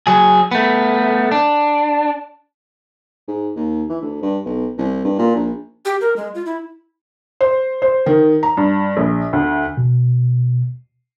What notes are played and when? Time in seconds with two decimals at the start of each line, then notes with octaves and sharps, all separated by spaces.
0.07 F#3 G#4
0.51 A3 B3
1.32 D4
3.28 G#2
3.56 D#2
3.89 E3
4.02 D2
4.22 G2
4.45 B1
4.78 C2
5.05 G2
5.19 A#2
5.35 A#1
5.85 G4
6.01 A#4
6.16 G#3
6.35 F4
6.46 E4
7.41 C5
7.82 C5
8.06 D#3
8.43 A#5
8.57 G2
8.97 A#1
9.33 D2
9.77 B2